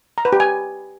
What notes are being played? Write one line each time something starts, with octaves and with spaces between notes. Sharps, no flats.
A#5
B4
G4
G#5